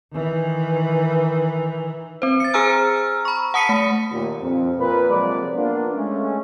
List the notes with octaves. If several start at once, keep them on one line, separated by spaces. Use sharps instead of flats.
D#3 E3
C4 C5
A6 C#7
G#4 C5 G#5 A#5 E6 F6
B5 C#6
F#5 A5 D#6 B6 C#7 D#7
A3
D#2 A#2
F2
A#2 B4
C3 F3 F#3 G#3 A#3 D5
A#3 B3 D4 F4
G#3 A3 C#4